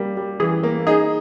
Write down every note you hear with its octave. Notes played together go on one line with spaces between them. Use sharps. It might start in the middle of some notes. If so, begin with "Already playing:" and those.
Already playing: G3 A#3
G3
E3 G#4
A#3
D#4 G#4